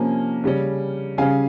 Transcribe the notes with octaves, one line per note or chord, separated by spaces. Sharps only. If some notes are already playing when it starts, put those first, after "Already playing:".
Already playing: C3 F3 A#3 C#4 G#5
C#3 G3 C#4
C#3 G3 C#4 F5 G#5